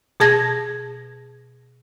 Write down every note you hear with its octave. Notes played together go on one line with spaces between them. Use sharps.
B2 G#4 A5 G#6 A#6